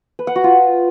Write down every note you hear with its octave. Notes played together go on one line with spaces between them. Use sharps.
B4
F#5
F#4
F4